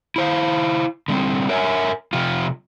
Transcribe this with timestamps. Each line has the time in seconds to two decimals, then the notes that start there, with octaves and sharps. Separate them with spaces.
0.16 E4 C5 F5
1.08 D3 G3 B3 C4
1.49 A#4 C#5 E5 G5 G#5
2.13 C3 F3 F4